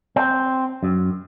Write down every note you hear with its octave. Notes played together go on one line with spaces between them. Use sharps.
C4
F#2